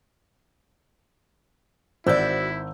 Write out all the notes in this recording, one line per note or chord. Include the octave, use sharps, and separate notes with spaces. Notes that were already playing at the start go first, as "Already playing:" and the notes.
G#1 E4 F#4 C5 D5 E6 G6